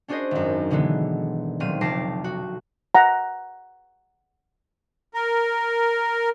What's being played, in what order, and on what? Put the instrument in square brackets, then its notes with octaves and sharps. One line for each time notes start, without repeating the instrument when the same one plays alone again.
[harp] C#4 D4 F#4 G#4 C5 D#5
G#1 F#2
B2 D3 E3 G#3 B3
D#1 F#3 C4 F6 D#7
F1 B1 A5 D6 A#6 C7
F#4
[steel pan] F#5 A#5
[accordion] A#4